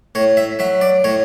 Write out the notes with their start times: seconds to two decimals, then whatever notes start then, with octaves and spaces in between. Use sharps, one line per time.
0.15 A2 C#5
0.37 E5
0.59 F#3 E5
0.81 D5
1.04 A2 C#5